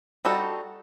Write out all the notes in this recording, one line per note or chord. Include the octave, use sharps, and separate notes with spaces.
G3 D4 D#4 F#4 A4